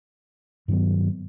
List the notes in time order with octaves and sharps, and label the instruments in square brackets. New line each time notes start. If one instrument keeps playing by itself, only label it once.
[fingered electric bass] G2 D#3 F#3 B3